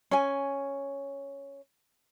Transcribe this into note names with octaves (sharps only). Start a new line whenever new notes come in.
C#4 G#5